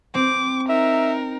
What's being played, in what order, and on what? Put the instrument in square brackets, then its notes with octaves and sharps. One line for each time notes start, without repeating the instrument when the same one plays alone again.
[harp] C4 [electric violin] D6
[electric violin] D#4 A#4 [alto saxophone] E5